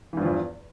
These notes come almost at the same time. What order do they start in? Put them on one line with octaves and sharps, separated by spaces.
E3 G2 F3 E2